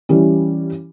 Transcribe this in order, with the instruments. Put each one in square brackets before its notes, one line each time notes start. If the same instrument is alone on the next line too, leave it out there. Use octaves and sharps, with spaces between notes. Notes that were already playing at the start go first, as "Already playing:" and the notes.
[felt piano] E3 G3 C#4